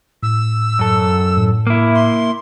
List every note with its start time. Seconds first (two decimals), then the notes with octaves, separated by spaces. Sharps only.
0.23 A2 E6
0.79 F#2 A4
1.37 A2
1.67 A#3 E4
1.95 C6